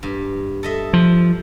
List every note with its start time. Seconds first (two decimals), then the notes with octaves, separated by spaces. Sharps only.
0.03 G2
0.63 A4 D#5 E5
0.93 F3